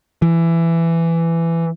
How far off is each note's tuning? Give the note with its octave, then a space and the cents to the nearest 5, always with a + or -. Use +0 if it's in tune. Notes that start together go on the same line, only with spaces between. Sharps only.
E3 +15